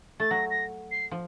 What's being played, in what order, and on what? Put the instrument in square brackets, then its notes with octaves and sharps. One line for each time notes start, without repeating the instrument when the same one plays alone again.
[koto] A3 [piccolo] A6
[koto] F#3 [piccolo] A#6
[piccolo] A#6
C7
[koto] F3